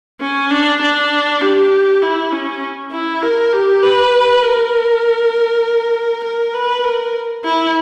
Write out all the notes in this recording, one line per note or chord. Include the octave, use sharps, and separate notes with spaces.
C#4
D4
D4
G4
E4
C#4
E4
A#4
G4
B4
A#4
A#4
B4
A#4
E4